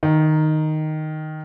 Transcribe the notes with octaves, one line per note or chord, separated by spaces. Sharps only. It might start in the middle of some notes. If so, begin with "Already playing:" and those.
D#3